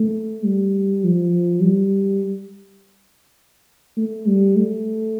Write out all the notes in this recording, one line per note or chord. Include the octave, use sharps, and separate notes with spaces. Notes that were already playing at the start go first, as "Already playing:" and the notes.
Already playing: A3
G3
F3
G3
A3
G3
A3